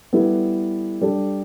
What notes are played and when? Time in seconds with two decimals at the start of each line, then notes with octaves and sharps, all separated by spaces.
0.13 G3 B3 E4 A4
1.01 G3 D4 A4